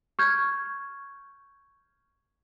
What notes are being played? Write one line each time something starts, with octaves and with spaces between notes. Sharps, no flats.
C#6 F6 G6 G#6